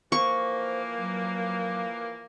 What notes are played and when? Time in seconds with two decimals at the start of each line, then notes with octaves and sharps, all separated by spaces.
0.12 E3 F3 A#3 C5 C#6
0.97 F#3